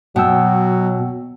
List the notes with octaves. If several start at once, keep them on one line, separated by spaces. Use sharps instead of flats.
B2 F#3 F#5 G5 E6